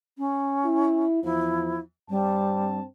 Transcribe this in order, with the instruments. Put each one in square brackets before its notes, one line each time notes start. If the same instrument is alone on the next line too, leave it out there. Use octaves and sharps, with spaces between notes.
[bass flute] C#4
[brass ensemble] E4
[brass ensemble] E2 F3 [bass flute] E4
[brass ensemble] G2 C4 A5 [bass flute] G3